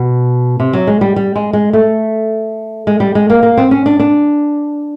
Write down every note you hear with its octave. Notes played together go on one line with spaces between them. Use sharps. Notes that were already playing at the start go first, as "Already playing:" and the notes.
Already playing: B2
C3
F#3
G#3
G3
G3
G#3
G#3
A3
G#3
G3
G#3
A#3
A#3
C4
C#4
D4
D4